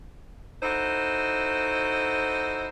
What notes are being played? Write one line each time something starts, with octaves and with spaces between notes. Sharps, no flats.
D#4 E4 F#4 A4 C5